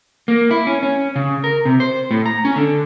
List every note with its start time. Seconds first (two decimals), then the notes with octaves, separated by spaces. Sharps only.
0.28 A#3
0.51 E4
0.67 C#4
0.83 C#4
1.16 C#3
1.44 A#4
1.65 C3
1.80 C5
2.11 A2
2.26 A#5
2.45 C#4
2.56 D3